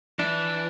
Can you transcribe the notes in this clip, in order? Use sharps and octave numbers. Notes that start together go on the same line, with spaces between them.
E3 D4